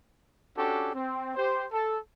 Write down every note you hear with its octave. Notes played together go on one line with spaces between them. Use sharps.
C#4 D4 F#4 G4 A4
C4
G4 C5
A4